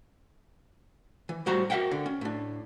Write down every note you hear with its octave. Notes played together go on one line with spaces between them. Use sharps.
E3
A2 G3 F#4 C5 A#5
F#4 A#4 B4 E5 F#5 G5
D3
C#4
A2 D4